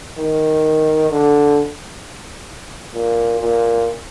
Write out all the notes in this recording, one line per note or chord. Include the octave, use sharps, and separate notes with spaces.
D#3
D3
A#2
A#2